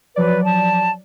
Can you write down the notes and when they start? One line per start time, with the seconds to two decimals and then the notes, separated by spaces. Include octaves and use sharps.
0.16 F3 F#3 B4 D5
0.45 A5